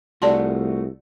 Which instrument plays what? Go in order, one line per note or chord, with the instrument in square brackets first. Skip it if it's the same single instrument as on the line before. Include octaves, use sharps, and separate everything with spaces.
[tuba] C2 [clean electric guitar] A3 F4 F#4 [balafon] D5 A5 C6